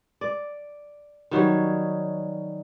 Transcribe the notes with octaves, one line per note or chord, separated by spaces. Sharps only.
D5
D#3 F#3 G3 C#5